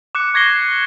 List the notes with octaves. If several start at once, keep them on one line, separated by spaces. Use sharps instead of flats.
D6 F#6 C#7
C#6 G#6 A#6 C7 G7